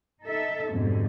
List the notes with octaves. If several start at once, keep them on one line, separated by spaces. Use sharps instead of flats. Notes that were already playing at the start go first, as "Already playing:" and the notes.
D#4 A4 E5
F2 G#2 B2 D3 G3